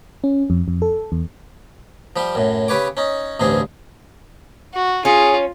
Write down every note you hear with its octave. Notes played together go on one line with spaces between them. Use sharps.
C#4
F2
F2
A4
E2
F3 G3 G4
F#2 A2
C#3 G4 B4 C#5 D6
C#4 D#4
A1 D2 G2 C4 G#4
F#4
C#4 F4 G#4